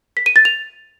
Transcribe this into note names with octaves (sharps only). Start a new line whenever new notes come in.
B6
D#7
A6
F7